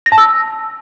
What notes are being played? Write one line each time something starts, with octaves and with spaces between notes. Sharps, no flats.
A#6
A5
E6